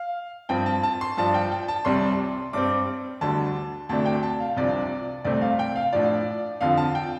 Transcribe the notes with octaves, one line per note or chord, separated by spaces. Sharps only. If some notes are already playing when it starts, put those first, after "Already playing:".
Already playing: F5
G2 F3 C4 G5
A5
A5
C6
G2 F3 D4 A5
G5
G5
A5
C2 C3 G3 C6
G2 G3 C4 D6
D2 D3 G3 A5
D2 C3 A3 D4 A5
G5
A5
F5
C2 C3 F3 D4 D5
C2 C3 A3 C4 D5
F5
G5
F5
A2 F3 D4 D5
F2 D3 F3 F5
A5
G5